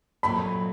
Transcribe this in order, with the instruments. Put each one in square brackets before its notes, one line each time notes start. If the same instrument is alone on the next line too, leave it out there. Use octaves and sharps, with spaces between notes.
[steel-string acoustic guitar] A#2 F#3 A3 C4 F4 [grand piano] B5